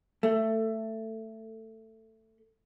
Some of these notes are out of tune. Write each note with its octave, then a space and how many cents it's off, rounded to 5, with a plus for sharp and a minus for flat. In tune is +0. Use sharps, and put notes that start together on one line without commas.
A3 +15